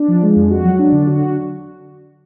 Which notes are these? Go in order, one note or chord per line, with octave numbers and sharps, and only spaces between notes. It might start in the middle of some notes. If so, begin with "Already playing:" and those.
Already playing: D4
F3
G#3
F2
F#4
F#3
D4
D3
F#4